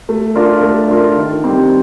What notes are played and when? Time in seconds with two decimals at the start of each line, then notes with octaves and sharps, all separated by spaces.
0.09 A3
0.35 D4 F4 A#4
0.62 A3
0.88 D4 F4 A#4
1.16 D#3
1.43 G3 C4 G4